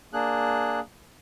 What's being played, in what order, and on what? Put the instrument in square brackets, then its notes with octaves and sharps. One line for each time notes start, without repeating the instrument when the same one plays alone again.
[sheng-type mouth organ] A#3 D4 G#4 F#6